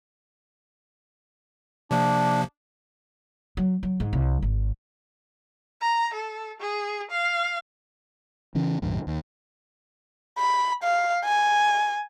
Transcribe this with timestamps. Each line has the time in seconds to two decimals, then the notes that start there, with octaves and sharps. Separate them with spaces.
1.91 C3 F3 A#3 D4
3.57 F#3
3.83 F#3
4.00 G#2
4.13 C2
4.42 G#1
5.81 A#5
6.14 A4
6.60 G#4
7.11 F5
8.55 C#3 E3 C#4
8.82 A#1 F2 G#2 D3
9.07 D#2
10.38 B5
10.83 F5
11.25 G#5